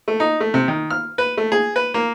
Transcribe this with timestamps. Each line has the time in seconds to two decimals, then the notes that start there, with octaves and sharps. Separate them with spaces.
0.08 A3
0.20 D#4
0.40 A3
0.54 C3
0.68 D#3
0.90 F6
1.18 B4
1.37 A3
1.52 G#4
1.76 B4
1.94 A#3